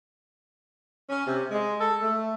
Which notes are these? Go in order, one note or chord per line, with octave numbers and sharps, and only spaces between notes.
C#4
C3
G#3
A4
A3